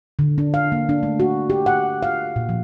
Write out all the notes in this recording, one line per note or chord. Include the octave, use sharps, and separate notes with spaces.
D3
D4
F5
A#3
D4
A3
F#4
G4
F#5
F5
A#2
F3